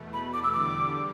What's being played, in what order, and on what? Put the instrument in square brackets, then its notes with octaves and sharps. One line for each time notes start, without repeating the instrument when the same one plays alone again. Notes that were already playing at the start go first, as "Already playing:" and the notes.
Already playing: [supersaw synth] E2 B2 A3
[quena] B5
D6
E6
[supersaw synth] E2 D3 G3 [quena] D6